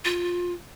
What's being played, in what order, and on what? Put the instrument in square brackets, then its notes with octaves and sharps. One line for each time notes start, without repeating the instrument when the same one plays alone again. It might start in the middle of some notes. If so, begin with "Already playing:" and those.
[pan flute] F4